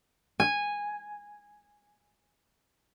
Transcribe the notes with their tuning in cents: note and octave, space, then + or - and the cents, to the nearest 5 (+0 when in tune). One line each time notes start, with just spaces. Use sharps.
G#5 -10